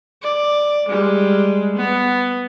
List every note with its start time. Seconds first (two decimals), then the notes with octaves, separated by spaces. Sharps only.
0.22 D5
0.89 G3 G#3
1.77 B3